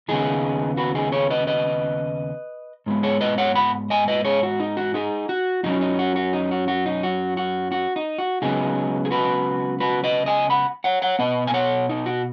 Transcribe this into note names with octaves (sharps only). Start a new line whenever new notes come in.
D#2 C#3 B3 D#4 G#4
F#4 B4
D#4 G#4
G#4 C#5
B4 D#5
B4 D#5
G#2 G#3 B3
G#4 C#5
B4 D#5
C#5 F#5
F#5 B5
D#5 G#5
B4 D#5
G#4 C#5
F#4
D#4
F#4
D#4 G#4
F#4
F#2 F#3 C#4 D#4
D#4
F#4
F#4
D#4
F#4
F#4
D#4
F#4
F#4
F#4
D#4
F#4
C#2 C#3 F#3 B3 D#4 G#4
G#4
F#4 B4
F#4 B4
B4 D#5
D#5 G#5
F#5 B5
C#5 F#5
C#5 F#5
B2 B3 B4 D#5
G#5
C#5 F#5
D#4
F#4